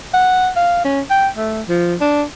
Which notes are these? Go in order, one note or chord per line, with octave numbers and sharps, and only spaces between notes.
F#5
F5
C#4
G5
A3
F3
D4